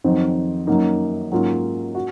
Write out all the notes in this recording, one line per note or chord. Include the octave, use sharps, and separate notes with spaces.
F2 D#3 F#3 C4 D#4
F#2 D#3 F#3 A#3 D#4
G#2 F#3 A#3 C#4 F4
F#4